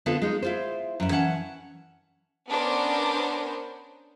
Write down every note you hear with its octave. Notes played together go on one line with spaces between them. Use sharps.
D3 B3 C4 F4 A4
G#3 D#4
E4 F4 C5
F#2 E4
E3 C#4 F#5 A5
B3 C#4 D4 A#4 C5